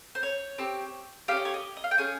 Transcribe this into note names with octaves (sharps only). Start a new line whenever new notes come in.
C5
C#5
C4 G4
C#4 G4 F5
D#5
C#5
D#5
D#5
F5
G5
C#4 G#4 G#5